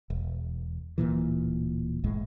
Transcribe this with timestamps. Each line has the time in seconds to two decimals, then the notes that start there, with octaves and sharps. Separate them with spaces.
0.10 E1
0.98 D1 G1 A#2 E3
2.04 F#1 C#2 A2 G#3